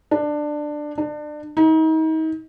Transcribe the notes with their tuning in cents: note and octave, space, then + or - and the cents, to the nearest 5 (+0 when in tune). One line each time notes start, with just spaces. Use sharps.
D4 +15
D4 +30
D#4 +35